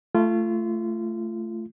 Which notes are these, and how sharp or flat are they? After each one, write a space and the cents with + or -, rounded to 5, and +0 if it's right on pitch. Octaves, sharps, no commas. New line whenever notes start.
A3 +0 F4 -25